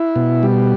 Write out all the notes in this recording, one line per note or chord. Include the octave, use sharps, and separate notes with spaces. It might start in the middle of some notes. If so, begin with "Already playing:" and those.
Already playing: E4
B2
G3